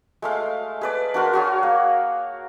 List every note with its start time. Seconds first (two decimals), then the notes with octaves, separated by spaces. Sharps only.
0.22 G#3 A3 F5
0.81 G#4 B4 D5
1.14 D4 F#4 A#4 C5
1.33 F#4 G#4 C#5
1.63 A#3